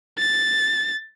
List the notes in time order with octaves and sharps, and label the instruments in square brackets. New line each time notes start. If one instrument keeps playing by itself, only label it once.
[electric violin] A6